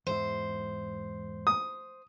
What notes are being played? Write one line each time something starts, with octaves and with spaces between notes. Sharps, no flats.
E2 G#2 E4 C5
D#6